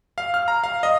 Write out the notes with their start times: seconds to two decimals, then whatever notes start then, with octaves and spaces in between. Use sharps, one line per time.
0.18 F5
0.34 F6
0.48 A#5
0.64 F5
0.83 D#5